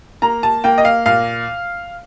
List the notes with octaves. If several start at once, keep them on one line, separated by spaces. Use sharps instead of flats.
A#3 A#5
A5
A#3 G5
D#5
F5
A#2 F5